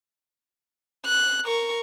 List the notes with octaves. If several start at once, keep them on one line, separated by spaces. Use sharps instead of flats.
F#6
A#4 C#6